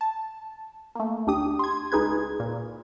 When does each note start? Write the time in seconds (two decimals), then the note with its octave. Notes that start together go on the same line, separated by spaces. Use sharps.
0.01 A5
0.95 A3 A#3
1.27 D2 D4 G4 D#6
1.59 C6 G#6
1.92 C#2 D#4 G#4 B4 G#6
2.40 A#2